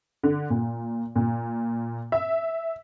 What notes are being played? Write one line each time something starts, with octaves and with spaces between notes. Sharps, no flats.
D3
A#2
A#2
E5